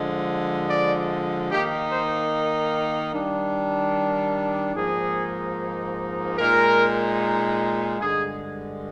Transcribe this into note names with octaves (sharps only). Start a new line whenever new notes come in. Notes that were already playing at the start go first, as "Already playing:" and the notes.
Already playing: D3 F3 G#3
D5
D#3 A#3 D#4 G4
C5
D#3 G3 D4
G#2 F3 A#3 D#4 G#4
A#2 G#3 D#4 A#4
G2 D3 G#3 G#4